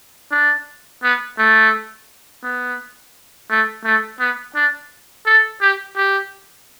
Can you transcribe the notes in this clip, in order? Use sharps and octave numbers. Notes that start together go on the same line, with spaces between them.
D4
B3
A3
B3
A3
A3
B3
D4
A4
G4
G4